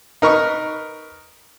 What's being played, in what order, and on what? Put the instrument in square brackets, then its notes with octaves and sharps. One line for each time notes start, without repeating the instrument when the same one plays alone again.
[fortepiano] D#4 A#4 B4 C#6